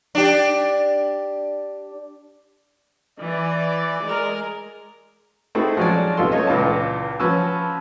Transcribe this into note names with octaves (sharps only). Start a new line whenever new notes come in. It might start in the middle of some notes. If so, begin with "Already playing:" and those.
D4 G4
E3 D5
G#3 A#4
A3 C4 D#4 E4 F#4 G#4
F3 F#3 G#3 C#4 F#4 D5
B1 C3 F4 A4 C6
A3 C#4 C#5 D#5
C#2 A#2 E3 F4 A5
F3 C#4 F#4 B4 A5 E6